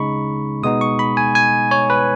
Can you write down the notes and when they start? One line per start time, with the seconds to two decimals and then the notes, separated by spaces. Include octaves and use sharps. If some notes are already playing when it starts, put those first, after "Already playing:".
Already playing: C#3 G#3 D#4 B5 C#6
0.63 B2 G#3 B3 D#4 D#6
0.81 C#6
0.99 B5
1.17 G#5
1.35 G#5
1.71 C#5
1.90 B4